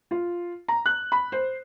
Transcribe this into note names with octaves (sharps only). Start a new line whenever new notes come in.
F4
A#5
F#6
B5
C5